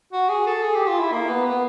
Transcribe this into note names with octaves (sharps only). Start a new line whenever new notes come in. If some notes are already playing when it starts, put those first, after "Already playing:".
F#4
G#4
A4
G#4
G4
F4
E4
A#3
B3
B3